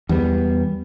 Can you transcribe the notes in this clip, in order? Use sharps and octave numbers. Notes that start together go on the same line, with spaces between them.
E2 G3 B3